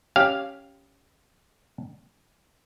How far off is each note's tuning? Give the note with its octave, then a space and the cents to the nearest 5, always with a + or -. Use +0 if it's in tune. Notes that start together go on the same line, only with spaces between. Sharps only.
C#4 +0 G4 +0 F5 +0